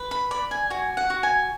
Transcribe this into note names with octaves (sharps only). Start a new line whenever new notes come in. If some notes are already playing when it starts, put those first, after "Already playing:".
Already playing: B4
B5
D5 B5
G#5
F#4 G#5
F#5
F#4
G#5